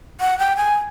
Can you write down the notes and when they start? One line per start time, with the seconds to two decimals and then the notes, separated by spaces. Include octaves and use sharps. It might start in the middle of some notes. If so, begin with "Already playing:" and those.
0.21 F#5
0.39 G5
0.57 G#5